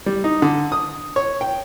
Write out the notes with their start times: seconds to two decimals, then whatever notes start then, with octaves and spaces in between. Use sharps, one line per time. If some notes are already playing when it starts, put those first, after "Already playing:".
0.06 G3
0.24 D#4
0.42 D3
0.72 D#6
1.16 C#5
1.41 G5